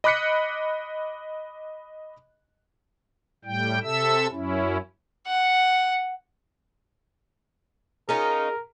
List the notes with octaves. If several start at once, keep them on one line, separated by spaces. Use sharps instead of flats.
D#5 B5 D6 F#6 B6 C#7
A2 G3 G5
C3 A4 E5 E6
F#2 C#4 E4
F#5
C#4 D#4 F4 G#4 A#4